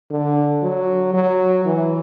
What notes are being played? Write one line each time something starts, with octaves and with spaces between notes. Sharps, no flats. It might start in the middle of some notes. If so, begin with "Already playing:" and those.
D3
F#3
F#3
E3